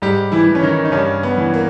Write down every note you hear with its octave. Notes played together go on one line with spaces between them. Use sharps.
G#2 G3 G4
E3 E4
E3
C#4
D#3 D#4
D#4
G2 C#3 C#4
B3
E3
A#3